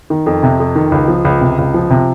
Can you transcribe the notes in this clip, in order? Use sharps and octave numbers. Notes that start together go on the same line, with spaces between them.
D#3
F2
C3
F2
D#3
C#2
F3
C#2
C3
C#2
F3
C3